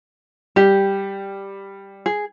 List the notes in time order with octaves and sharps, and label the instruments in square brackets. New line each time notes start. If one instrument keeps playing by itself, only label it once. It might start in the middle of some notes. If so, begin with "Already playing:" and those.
[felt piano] G3 [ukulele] G4
[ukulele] G#4